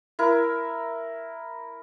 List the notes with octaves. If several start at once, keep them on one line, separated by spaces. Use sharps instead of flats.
E4 A#4